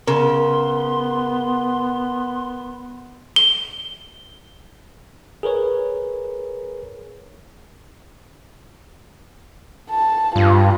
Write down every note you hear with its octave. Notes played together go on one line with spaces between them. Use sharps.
C#3 B3 A#4 C6
G7
G#4 A#4 B4 C#5
A5
G2 F4